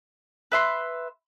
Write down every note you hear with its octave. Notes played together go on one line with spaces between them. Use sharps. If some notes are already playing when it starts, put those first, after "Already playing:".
B4 E5 C6